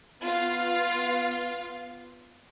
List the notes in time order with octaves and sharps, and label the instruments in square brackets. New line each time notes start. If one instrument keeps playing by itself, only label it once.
[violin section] B3 F4 F5